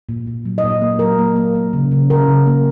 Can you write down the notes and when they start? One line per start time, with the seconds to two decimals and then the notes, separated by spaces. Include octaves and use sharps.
0.09 A#2
0.27 A#2
0.45 F#3
0.58 D#5
0.64 A#2
0.82 A#3
0.99 F#3 A#4
1.18 A#3
1.36 A#3
1.55 A#3
1.73 C#3
1.91 C#3
2.10 C#3 A#4
2.29 C#3
2.47 A#3